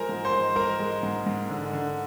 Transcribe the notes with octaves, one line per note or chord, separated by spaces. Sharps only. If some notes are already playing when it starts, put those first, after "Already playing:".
Already playing: F3 G#3 A#4 C5 G#5 A#5
G#2
C5 C6
G#3
G#3 A#4 A#5
G#3
G#2
G#2
D3
D3